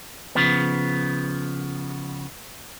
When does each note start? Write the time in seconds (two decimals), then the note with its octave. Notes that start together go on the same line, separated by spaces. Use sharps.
0.35 C#3 F3 B3